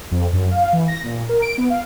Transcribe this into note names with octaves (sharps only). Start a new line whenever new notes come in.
F2
F#2
F5
E3
A#6
A#2
A#4
D7
B3
F5